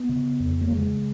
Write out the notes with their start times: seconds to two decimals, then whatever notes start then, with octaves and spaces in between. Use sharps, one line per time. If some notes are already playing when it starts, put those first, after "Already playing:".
Already playing: B3
0.09 C#3
0.40 F2
0.61 A#3
0.71 C#3 G#3